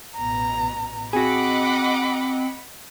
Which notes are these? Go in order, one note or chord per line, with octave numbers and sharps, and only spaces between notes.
A1 B2 A#5
C4 F#4 G#4 D#5 F#5 B5 D6